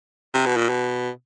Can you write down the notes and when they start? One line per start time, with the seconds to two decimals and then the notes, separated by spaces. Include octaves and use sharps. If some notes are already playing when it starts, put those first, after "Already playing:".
0.34 C3
0.46 B2
0.57 A#2
0.69 B2